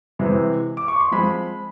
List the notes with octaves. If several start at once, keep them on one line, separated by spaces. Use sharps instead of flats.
C3 E3 G#3 C4
D6
C#6
C6
F3 G#3 C4 B5